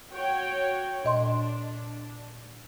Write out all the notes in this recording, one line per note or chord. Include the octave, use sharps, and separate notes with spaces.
F#4 C#5 G5
A#2 D4 D#5 C6